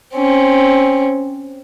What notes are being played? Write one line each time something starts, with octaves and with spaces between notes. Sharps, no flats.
C4 C#4